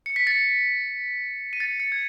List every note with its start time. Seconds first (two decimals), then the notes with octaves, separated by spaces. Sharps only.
0.06 C#7
0.16 B6
0.27 A6 C#7
1.53 D#7
1.60 A6 C#7
1.80 A6 C#7
1.92 G#6